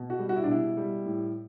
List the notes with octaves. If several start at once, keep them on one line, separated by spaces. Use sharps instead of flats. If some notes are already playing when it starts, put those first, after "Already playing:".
Already playing: B2
F#4
G3
F#4
E4
D4
B2 E4
G3
A2